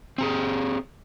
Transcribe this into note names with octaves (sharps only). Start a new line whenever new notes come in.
C4 G4 G#4